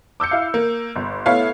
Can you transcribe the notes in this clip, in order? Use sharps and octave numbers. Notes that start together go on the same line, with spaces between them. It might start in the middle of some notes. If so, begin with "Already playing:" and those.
D6 E6 G6 C#7
E4 F5
A#3
G1
A3 B3 E4 C#5 F5